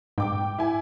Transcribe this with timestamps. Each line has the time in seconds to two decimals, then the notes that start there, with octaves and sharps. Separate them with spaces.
0.18 G#2 G5 D6
0.59 E4 G#5